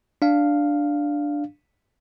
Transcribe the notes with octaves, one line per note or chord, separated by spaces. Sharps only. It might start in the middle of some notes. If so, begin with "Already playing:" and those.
D4 F5